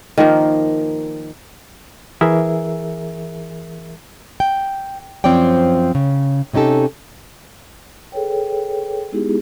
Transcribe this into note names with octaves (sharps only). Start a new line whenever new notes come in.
D#3 F3 A#3
E3 G#4 A#4 E5
G5
F#2 F3 C4 C#5 D5 G5
C#3
C3 C#4 D#4 G4 A4
G#4 A4 B4 C#5 G5
G#3 B3 D#4 E4 G4 G#4